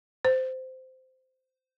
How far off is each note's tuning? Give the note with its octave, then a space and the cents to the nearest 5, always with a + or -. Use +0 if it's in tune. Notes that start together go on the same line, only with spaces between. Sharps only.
C5 -15